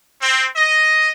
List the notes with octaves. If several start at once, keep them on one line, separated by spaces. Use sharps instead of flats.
C4
D#5